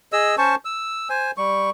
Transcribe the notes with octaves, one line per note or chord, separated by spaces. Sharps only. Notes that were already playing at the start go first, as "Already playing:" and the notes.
G#4 D#5 E6
C#4 C5 A5 C#6
E6
C5 G#5
G3 C#6